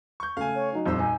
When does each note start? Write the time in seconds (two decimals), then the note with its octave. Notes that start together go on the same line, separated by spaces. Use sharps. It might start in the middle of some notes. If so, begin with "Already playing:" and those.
0.20 C#6 G6
0.37 C#3 A3 F5 G#5
0.55 C#5
0.74 F#3 D#4
0.86 D#1 F2 G3 C5 E6
0.99 D#4 G#5